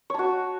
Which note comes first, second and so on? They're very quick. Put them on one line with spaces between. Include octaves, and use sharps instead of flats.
C#5 A5 F#4